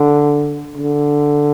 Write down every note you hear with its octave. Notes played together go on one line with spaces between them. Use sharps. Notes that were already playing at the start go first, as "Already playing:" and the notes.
Already playing: D3
D3